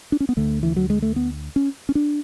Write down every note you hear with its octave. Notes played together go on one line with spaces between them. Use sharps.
D4
C#4
B3
D2 D3 A3
E3
F#3
G#3
A3
B3
C#4
C#4
D4